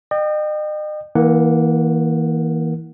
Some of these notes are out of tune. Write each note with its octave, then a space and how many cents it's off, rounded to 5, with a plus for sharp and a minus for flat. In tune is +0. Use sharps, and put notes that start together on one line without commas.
D#5 -40 G5 +0
E3 -30 A#3 +5 F#5 -5